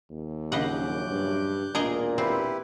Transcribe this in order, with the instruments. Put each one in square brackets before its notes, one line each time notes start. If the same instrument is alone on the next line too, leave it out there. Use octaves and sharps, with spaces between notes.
[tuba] D#2
[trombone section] A#1 F#2 [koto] C#3 D#5 F#5 [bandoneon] D6 F#6 G6
[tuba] G2
[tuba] E1 [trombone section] A1 A#2 [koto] G#4 A#4 D#5
[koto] C4 [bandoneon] E4 G4 B4